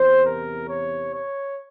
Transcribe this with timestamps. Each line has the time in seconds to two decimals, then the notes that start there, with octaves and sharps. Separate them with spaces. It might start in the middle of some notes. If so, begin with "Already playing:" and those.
Already playing: E2 C3 E3 C5
0.24 A#4
0.67 C#5
1.12 C#5